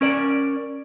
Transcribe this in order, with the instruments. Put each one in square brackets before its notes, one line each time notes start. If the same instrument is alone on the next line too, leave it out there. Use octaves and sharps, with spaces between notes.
[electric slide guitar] C#4 A#4 D5